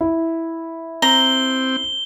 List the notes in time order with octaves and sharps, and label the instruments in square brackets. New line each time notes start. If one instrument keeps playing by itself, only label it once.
[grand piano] E4
[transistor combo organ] C4 [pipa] A#5 [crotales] G7